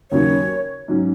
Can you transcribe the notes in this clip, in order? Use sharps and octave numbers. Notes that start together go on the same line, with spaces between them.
D#2 C#3 F#3 C#5
G#2 F#3 C#4